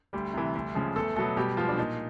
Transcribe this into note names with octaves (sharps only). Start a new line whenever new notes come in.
D2 G3 G4
C3 E3
D2
C#3 F3 G#3
E2 A3 A4
B2 F#3 A3 B3 A4
B2 G3 G4
F3 G#3 B3 F4
D4
A#2 D#4